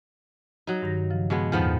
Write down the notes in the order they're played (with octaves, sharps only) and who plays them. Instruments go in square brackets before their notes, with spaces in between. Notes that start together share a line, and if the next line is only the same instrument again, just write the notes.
[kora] F#3 D#4
[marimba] G2 D#3 A#6
C#3 F3
[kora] B2 G#3 B3
[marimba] E2 A2 [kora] D#3 F3 B3